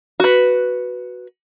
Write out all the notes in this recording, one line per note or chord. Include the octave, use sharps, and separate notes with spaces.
F#4 B4